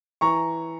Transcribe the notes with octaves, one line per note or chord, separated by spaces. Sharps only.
E3 A#5 C#6